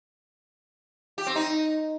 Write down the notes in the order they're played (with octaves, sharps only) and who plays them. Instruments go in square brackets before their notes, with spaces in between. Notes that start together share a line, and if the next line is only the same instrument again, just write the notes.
[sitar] G4
C4
D#4